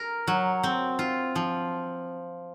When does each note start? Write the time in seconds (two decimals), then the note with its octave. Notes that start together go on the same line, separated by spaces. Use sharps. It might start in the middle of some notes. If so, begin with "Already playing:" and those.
Already playing: A#4
0.27 F#3
0.64 C4
0.99 F4
1.36 F3